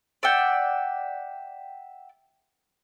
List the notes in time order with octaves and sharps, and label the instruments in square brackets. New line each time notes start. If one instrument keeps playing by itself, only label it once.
[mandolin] D5 E5 F#5 G5